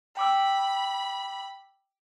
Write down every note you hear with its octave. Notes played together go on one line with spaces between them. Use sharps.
G5 B5 D6 E6